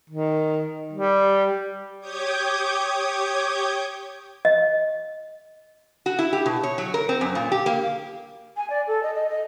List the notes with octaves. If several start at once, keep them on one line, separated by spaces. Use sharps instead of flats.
D#3
G3
G4 C#5 D6 D#6 G6 G#6
D#5
F#4
E4
G4
B2
C#5
F#3
A#4
C4
F#2
A#2
G4
A#3
G#5
D5
A4
D#5
D#5
D#5